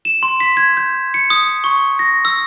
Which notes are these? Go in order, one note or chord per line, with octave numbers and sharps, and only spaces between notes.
E7
C6
B6
G#6
G6
C#7
D#6
C#6
A#6
E6